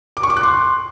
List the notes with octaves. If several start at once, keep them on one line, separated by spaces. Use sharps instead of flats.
D6
C#6
D6
F#6
C6